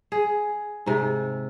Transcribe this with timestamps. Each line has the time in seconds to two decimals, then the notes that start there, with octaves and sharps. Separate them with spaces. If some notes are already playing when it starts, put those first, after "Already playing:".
0.12 G#4
0.86 G#2 C3